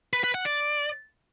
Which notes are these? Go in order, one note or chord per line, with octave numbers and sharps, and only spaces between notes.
B4
B4
F#5
D5